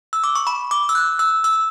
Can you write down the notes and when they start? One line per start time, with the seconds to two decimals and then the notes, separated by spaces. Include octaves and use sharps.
0.13 E6
0.24 D6
0.35 C#6
0.47 B5
0.71 D6
0.89 E6
0.95 F#6
1.19 E6
1.44 E6